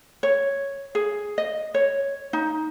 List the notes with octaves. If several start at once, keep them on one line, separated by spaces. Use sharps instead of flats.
C#5
G#4
D#5
C#5
D#4